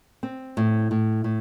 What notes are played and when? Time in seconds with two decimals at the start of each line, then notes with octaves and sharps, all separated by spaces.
0.23 C4
0.57 A2
0.91 A2
1.24 A2